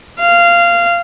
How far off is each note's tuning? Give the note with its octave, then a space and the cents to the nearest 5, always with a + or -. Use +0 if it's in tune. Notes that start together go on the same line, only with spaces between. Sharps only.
F5 -15